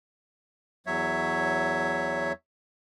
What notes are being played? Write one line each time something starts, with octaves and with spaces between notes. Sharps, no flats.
E2 F#3 C#5 E5